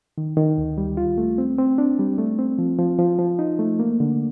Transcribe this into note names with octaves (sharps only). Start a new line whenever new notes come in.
D#3
D#3
D2
G3
F4
A3
C4
C4
D4
G3
A3
C4
F3
F3
F3
F3
D#4
A3
A#3
D3